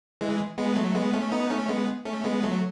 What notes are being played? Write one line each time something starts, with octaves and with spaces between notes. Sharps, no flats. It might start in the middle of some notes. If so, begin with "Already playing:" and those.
E3 G#3
G#3 B3
F#3 A3
G#3 B3
A3 C#4
B3 D#4
A3 C#4
G#3 B3
A3 C#4
G#3 B3
F#3 A3